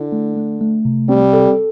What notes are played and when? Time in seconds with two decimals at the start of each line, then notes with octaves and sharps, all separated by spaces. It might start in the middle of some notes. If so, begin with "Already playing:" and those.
Already playing: D3 E4
0.12 A3
0.36 A3
0.61 A3
0.85 C3
1.09 G3 C4
1.33 A4